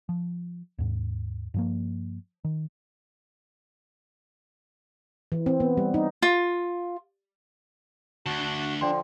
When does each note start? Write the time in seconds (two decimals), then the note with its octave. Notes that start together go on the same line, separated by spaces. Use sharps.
0.09 F3
0.79 D#2 G#2
1.54 G2 F3 A#3
2.45 D#3
5.32 E3
5.46 C4
5.60 B3
5.77 G3
5.94 D#4
6.22 F4
8.26 D2 D4 F#4 A5
8.81 D3 F3 D5 G5 C6